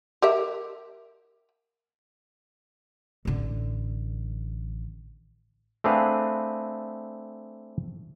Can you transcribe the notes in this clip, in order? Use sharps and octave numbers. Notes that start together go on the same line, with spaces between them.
G4 A#4 E5
A1 D3
A3 C4 D4 G#4 B4 F5